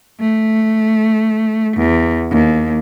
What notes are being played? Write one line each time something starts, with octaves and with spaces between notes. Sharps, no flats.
A3
E2
D#2